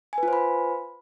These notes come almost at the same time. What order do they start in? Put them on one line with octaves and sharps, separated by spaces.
G#5 B4 F4 C5 B5